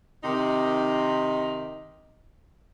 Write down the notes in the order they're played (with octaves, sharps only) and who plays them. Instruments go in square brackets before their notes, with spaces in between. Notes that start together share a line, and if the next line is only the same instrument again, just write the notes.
[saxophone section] C3 D#3 D#4